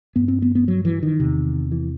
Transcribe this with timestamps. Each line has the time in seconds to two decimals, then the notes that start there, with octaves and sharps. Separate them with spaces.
0.16 G2 B3
0.28 C4
0.42 B3
0.55 B3
0.68 F#3
0.85 E3
1.03 D#3
1.20 E2 C3
1.72 E3